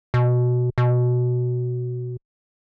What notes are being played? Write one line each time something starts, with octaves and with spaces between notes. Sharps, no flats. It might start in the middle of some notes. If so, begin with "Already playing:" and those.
B2
B2